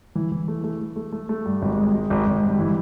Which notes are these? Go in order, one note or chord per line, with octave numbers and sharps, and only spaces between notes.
E3
E3
A3
A3
A3
A3
A3
A3
G2
G#1
G#3
G#3
G#1
G#1
G2
E3